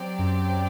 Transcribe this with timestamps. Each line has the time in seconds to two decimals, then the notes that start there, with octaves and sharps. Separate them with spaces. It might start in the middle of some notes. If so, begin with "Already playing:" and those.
Already playing: F#3 C4 G4 D5
0.19 F#2